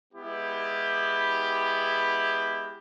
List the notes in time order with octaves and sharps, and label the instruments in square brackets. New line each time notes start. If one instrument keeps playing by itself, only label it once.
[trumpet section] G#3 B3 E4 G4